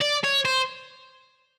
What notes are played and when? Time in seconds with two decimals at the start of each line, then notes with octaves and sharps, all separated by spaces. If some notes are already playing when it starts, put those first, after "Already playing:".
0.01 D5
0.24 C#5
0.45 C5